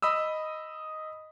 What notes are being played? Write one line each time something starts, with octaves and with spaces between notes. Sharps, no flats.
D#5 B5 D#6 E6